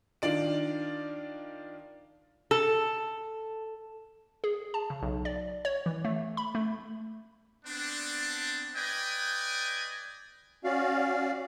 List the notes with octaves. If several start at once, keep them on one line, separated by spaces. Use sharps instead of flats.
D#3 D4 F4 D5 D7
A4
G#4
A5
C#3
B1
D5
C#5
E3
A3
B5
A3
B3 C4 D4
B4 D5 D#5 G5 G#5
C#4 F#4 D5 F5